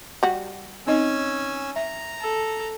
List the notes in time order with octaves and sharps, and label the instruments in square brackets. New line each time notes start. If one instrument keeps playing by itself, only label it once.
[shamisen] G3 F#4
[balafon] C4 D#4 D#5 [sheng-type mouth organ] C#4 G#5 E6
[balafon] E5 [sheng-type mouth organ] A#5
[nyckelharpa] A4